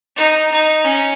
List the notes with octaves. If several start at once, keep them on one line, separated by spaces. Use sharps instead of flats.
D#4
D#4
C#4